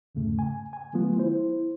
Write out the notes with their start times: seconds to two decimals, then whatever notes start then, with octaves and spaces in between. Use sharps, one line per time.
0.15 E2 G#2 C#3 A3
0.39 G#5
0.73 G#5
0.93 D#3 F#3 A3 B3 F4
1.18 E4 C5